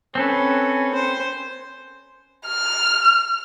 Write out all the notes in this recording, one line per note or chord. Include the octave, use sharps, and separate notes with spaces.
C4 C#4 A4 B4
C5
F6